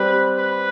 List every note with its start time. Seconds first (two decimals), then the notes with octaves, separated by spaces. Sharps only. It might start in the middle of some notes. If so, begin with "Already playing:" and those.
Already playing: G3 C4 G4 B4 D5
0.38 B4